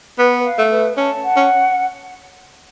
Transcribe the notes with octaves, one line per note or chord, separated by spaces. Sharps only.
B3 B4
F5
A3
B4
C#4 A5
F#5
C#4